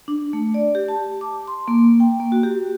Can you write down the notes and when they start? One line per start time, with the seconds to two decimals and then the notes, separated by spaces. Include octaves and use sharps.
0.08 D4
0.33 A3
0.54 D5
0.75 G4
0.88 A5
1.21 D6
1.48 C6
1.68 A#3
2.00 G5
2.20 A#3
2.32 F#4
2.43 G4